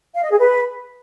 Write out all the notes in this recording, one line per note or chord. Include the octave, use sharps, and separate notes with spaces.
F5
D#5
G#4
B4